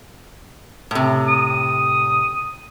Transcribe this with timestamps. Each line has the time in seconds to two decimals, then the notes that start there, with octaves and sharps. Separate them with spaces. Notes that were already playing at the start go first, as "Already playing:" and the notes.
0.91 A2 C3
1.28 D#6